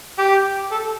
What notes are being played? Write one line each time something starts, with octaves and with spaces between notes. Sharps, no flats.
G4
A4